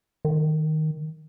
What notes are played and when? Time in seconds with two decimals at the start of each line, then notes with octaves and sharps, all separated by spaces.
0.25 D#3